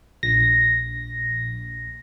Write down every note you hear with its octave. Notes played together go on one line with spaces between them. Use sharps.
A#1 A#6